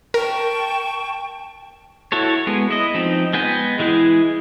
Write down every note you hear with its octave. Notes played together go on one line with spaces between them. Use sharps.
A#4 G5 A5 C#6
E4 F#4 A4 C#5
G#3 B3
E4 D#5
F3 C4 D#4
G#3 B3 G5 G#5 G6
E3 G#3 E4 G#4